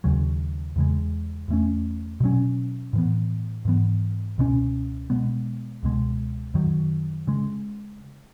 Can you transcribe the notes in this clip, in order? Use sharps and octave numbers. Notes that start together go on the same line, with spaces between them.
D#2 C#3 F#3
E2 C#3 G#3
E2 D#3 A3 C#4
B2 F#3 C#4
A2 E3 B3
G#2 E3 B3
C#2 B2 A3 C#4
B2 G#3 B3
C#2 B2 G#3
F#2 D#3 F#3
C#3 G#3